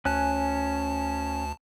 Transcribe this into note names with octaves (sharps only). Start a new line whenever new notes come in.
D2 C#4 G#5 A5 F#6